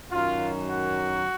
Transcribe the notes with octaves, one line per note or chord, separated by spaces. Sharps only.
F#2 D#3 F#3 F4
F#4